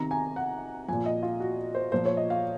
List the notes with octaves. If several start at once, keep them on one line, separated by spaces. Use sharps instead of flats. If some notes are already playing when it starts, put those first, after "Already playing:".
Already playing: C3 D#3 A#5
G#5
F#5
A#2 F3 G#5
D#5
F4
F#4
C5
A#2 F3 C5
C#5
D#5
F5